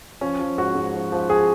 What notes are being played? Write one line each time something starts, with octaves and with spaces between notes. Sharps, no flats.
F3 C#4
F3
G#2 F#4
G#2
F3
F3
G#4